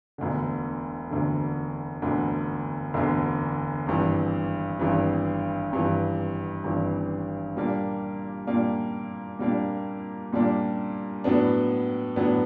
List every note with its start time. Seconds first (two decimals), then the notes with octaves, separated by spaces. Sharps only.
0.18 E1 D2 D3
1.10 E1 D2 D3
2.02 E1 D2 D3
2.94 E1 D2 D3
3.87 G#1 G2 E3
4.79 G#1 G2 E3
5.71 G#1 G2 E3
6.64 G#1 G2 E3
7.56 A#2 G3 A#3 D4
8.47 A#2 G3 A#3 D4
9.39 A#2 G3 A#3 D4
10.33 A#2 G3 A#3 D4
11.24 A2 F#3 B3 D4
12.16 A2 F#3 B3 D4